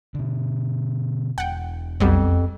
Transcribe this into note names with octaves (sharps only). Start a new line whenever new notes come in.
B2 D3
E1 F#5 G5
B1 F2 G3 B3